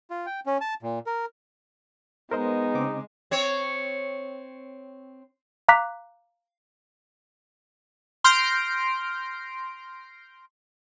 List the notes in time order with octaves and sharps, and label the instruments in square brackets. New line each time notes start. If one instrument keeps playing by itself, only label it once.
[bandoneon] F4
G5
C#4
A5
A#2
A#4
[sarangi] G#3 [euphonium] B3 [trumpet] D#4 [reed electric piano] A#4 C5 D#5
[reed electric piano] C#3 C4 D6
[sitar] C4 C#5
[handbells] F5 A#5 D6 F#6 B6
[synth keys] C6 F6 G6 A#6 C7 D7